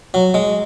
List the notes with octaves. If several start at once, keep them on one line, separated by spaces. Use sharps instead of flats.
F#3
G#3